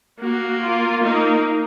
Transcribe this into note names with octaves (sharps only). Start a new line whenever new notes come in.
A#3 F#4
F4
A#3 D#4